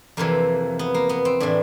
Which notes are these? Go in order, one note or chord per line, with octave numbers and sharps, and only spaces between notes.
F2 C3 E3 A#3
B3
A#3
B3
C4
A2 E3 D4